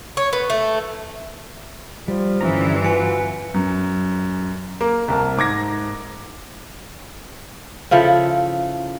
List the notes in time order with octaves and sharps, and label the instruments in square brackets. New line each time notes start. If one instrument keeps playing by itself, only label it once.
[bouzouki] C#5
B3
A3
[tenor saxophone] F3 [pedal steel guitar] G3
[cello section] G2 E3 [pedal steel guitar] D3 C#4 A#5
[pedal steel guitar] F4 F#4 [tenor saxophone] B4 [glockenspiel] G#5 C#7
[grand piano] F#2
A#3
C2 A#4 A5
G#2 D6 G#6 A#6
[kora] C#3 F3 E4 A4